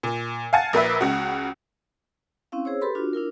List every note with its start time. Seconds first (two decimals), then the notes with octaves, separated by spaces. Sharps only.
0.03 A#2
0.53 F5 F#5 G#5 A5 A6
0.73 A#1 A#3 B4 E5
1.01 C#2 C#3 F#4
2.52 C4 C#4 E4 F5
2.65 G#4 C5 C#5 E6
2.81 G4 A4 B4 B5 C6
2.95 D4 F4 F#4
3.13 D4 E4 F4 A#4